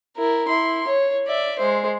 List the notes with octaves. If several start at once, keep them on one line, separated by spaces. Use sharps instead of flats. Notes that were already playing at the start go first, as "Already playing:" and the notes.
E4 A#4
E4 C6
C#5
D5 E5
G#3 C5